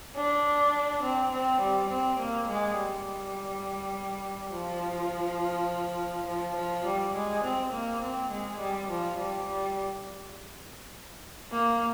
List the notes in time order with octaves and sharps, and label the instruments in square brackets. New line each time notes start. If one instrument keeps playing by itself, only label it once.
[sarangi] D4
C4
C4
G3
C4
A#3
G#3
G3
F3
F3
F3
G3
G#3
C4
A#3
C4
G#3
G3
F3
G3
G3
A#3